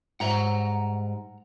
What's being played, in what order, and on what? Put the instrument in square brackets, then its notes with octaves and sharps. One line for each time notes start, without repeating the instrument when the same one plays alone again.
[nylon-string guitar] G#2 G3 E5 [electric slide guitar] F#5 A#5